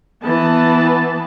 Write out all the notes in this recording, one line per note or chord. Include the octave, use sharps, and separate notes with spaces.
E3 B3 B4 A5